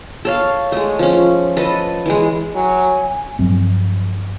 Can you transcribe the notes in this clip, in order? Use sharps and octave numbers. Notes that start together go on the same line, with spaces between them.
A4 C#5 F5
G#3 A3
F3 C#4
A4 B4 D#5
E3 G#3
F#3 G#5
G2 F3 F#3 C4